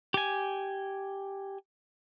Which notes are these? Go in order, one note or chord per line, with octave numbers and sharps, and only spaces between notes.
G4 G#5